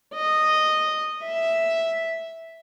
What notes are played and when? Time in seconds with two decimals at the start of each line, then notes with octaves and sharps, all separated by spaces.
0.15 D#5
1.25 E5